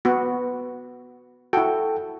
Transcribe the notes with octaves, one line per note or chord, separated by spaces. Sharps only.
B3 F#4
E4 F#4 A4 G5